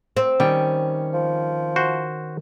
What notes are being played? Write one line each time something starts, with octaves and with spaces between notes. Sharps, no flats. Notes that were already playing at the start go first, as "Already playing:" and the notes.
C4
D#3 G3 C#4 G5
F3
F#4 C5